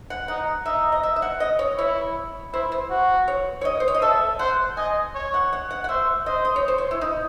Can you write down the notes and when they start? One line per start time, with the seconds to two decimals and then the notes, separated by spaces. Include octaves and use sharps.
0.10 F#5
0.28 D#4 F#5
0.66 D#4 E5
0.92 D#5
1.03 E5
1.16 E5
1.22 F#5
1.40 D#5
1.59 C#5
1.78 E4 C#5
2.53 E4 C5
2.72 C5
2.90 F#4
3.28 C#5
3.61 C#5
3.65 D#5
3.80 C5
3.88 C#5
3.95 D#5
4.02 A4 E5
4.39 C5 F#5
4.77 D#5 G#5
5.15 C#5
5.34 F#5
5.53 F#5
5.71 F#5
5.84 F#5
5.89 C5 E5
6.26 C5 D#5
6.45 D#5
6.56 C#5
6.68 C5
6.78 C#5
6.91 E4
7.01 D#4